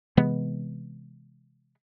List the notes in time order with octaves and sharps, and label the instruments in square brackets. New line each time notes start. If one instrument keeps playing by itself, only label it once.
[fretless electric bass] C3 E3 G#3 B3